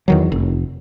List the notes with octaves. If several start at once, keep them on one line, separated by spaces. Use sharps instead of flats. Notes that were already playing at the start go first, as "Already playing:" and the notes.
E2 D#3 F#3
F1